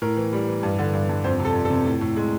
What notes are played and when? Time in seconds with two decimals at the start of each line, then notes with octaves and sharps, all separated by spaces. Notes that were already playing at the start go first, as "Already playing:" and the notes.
0.02 A2 A#4
0.17 E3
0.32 G3
0.48 E3
0.63 G2
0.79 D3
0.94 G2
1.09 G2
1.24 F2 C5
1.40 C3 A4
1.55 F2
1.65 A4
1.70 C3
1.85 A2
2.01 A2
2.16 G#3